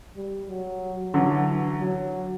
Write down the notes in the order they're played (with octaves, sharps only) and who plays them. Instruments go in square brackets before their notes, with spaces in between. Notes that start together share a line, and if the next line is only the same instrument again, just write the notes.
[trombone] G3
F#3
[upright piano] D3 F#3 [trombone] E3
[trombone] F#3